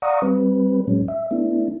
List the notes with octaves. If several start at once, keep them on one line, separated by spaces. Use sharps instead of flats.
D5 F5 F#5 A#5 C#6 D#6
G3 C4 B4
A2 F#3 G#3 C#4
E5
A3 B3 D4 E4